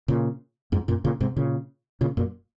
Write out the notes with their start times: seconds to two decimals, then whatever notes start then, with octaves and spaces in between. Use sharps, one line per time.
0.08 A#2 C#3
0.72 F2 G#2
0.88 F#2 A#2
1.05 A#2 C#3
1.21 G#2 C3
1.36 A#2 C#3
2.01 A#2 C#3
2.17 F#2 A#2